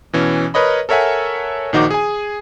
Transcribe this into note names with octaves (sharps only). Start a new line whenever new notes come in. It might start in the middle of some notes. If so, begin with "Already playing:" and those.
B2 E3 C#4
A#4 B4 C#5 D#5 B5
A4 A#4 C#5 E5 F#5 G#5
A#1 D#3 D#4 F#4 C5 D6
G#4 G#5